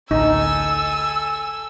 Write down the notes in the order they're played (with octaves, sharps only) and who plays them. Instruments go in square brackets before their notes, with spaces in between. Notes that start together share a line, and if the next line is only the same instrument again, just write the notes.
[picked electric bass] A1 D2 [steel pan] D#4 [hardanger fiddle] A4 G#5 [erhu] E6